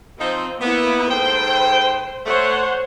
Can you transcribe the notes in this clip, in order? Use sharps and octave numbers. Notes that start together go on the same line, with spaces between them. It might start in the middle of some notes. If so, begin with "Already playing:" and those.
F3 C4 D#4
A#3 B3 E4
G#2 A4 C5 G5
A3 C5 C#5 F#5